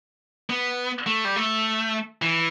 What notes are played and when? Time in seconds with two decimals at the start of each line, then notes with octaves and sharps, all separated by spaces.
0.50 B3
1.06 A3
1.25 G3
1.36 A3
2.22 E3